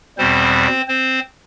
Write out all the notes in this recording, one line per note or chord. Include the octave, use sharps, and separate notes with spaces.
E2 B2 G3 C4 C5
C4 C5